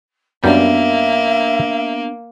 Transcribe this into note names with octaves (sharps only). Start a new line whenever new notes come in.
F#2 G3 A#3 B3 D4 E5